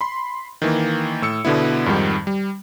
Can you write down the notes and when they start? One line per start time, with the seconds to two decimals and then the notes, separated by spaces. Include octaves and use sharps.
0.01 B5 C6
0.62 D#3 E3 A#3
1.22 A2 E6 C#7
1.45 B2 D3 B3 E4
1.86 F2 G#2 D#3 G3
2.27 G3